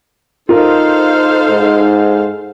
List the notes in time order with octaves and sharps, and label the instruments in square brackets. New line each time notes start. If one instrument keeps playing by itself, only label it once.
[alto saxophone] D#4 [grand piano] F4 A#4 [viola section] A4 C5 F5
[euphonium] G#2